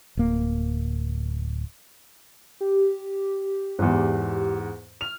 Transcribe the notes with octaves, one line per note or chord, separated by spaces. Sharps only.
D1 A#3
G4
E2 G#2
F6 F7